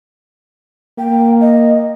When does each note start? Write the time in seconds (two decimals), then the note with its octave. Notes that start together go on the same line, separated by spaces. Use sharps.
0.99 A#3 G5
1.41 D#5